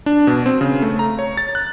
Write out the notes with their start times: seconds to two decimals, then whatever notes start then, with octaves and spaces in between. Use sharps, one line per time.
0.06 D4
0.27 B2
0.46 C4
0.61 C#3
0.82 A3
0.99 A#5
1.19 C#5
1.37 A6
1.55 F#6